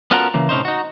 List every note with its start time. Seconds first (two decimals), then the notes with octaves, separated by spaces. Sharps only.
0.11 B3 C#4 F4 F#4 A4 A#4
0.34 C#3 E3 A#3
0.49 A2 C3 C#4 D#4 C5
0.65 D#4 F#4